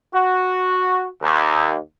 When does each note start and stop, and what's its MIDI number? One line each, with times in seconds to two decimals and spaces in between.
0.14 1.07 66
1.21 1.77 39